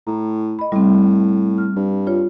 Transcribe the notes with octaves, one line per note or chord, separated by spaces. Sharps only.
A2 A#5
D#5 B5
A2 G3 C4
F6
G2
F4 C#5